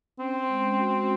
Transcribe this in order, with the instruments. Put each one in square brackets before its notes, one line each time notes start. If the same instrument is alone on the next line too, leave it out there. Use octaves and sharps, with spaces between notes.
[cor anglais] C4 [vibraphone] C#4
[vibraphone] G#3
F#4